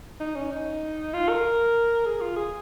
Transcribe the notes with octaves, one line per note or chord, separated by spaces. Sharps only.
D#4
C#4
D#4
F4
A#4
G#4
F4
G#4